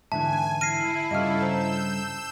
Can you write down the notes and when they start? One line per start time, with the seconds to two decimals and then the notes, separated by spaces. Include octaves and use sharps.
0.12 G#2 D3 E3 E5 G#5 A5
0.61 E4 F6 A#6 C7 D#7
1.11 G2 C#3 E4 F4 A4 D#5 F5 F6
1.42 C5 A5 A#5 E6 G6 E7